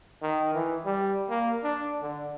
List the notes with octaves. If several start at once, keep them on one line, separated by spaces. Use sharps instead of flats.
D#3
E3
G3
A#3
D4
D3